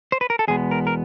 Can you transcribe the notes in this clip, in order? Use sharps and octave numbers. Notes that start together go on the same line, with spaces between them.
C5
B4
A#4
A4
E2 B2 G#3 B3 G#4
A#4
A#4